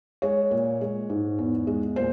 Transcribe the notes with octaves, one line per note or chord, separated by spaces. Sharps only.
G#3 C#5
A#2
G#3
G#2
E2
G#3
A#2 C5